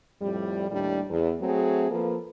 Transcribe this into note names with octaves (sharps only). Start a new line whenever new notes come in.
F2 A2 G3
D#2 A2 G3 D4
E2
F#3 A3 C4 G#4
F3 A#3 A4 B4